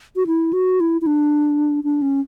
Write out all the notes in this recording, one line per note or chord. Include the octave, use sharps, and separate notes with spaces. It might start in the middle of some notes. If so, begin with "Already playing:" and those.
F#4
E4
F#4
E4
E4
D4
D4
C#4